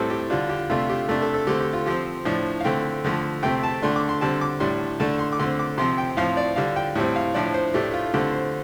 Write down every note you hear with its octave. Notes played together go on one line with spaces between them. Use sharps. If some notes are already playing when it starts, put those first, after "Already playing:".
Already playing: A2 G3 C4 A4
G4
D3 G3 D4 F4
G4
C3 A3 D4 F4
G4
C3 A3 D4
A4
A4
D3 A3 C4 G4
G4
F4
F3 C4 G4
A2 F3 D4
F5
D3 A3 C4 G5
D3 F3 A3
C3 A3 C4 G5
A5
D3 A3 D4 C6
D6
C6
D3 G3 C4 A5
D6
A2 G3 D4 C6
D3 A3 D4 A5
C6
D6
D3 A3 C4 C6
D6
C3 F3 C4 C6
G5
A2 F3 C4 F5
D5
D3 G3 D4 F5
G5
A2 G3 C4
F5
A2 F3 D4 D5
C5
A2 A3 D4 G4
F4
D3 A3 C4 G4
C5